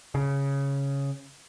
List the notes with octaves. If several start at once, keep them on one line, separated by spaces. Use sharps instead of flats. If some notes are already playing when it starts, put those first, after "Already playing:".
C#3